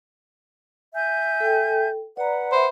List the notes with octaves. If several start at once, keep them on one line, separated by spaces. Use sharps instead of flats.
E5 G#5 G6
A4 G5
B4 D5 F#5 A#5
C5 E5 B5